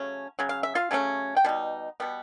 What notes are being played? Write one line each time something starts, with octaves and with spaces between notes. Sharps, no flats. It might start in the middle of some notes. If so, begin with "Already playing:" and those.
Already playing: C#3 F#3 A3 C#4
C#3 F#3
F5
E5
F4 F5
C#3 F#3 A3 C#4
G5
B2 G3 D#4
B2 G3 B3